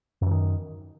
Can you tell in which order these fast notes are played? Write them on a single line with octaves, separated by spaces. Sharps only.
F#2 E3 D#3